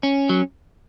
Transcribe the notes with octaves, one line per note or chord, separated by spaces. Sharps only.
C#4
F#3